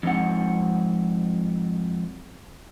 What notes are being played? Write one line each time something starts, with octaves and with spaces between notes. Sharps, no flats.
F2 G#2 C4 F#5